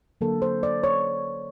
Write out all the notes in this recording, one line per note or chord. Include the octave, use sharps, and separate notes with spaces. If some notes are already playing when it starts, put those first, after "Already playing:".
D3 F#3 A#3 A4
C5
D5
C#5